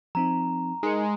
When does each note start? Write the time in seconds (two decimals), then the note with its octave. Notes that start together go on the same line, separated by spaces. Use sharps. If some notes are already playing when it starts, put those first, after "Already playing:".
0.15 F3 C4 D#4 A#5
0.83 G#3 D#4 A#4 C#7